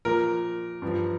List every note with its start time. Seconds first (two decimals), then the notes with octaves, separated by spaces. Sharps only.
0.05 A#2 F3 A#4
0.82 G2 F3